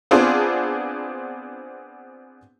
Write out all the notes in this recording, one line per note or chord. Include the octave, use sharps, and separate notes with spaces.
B3 C4 D4 F4 G#4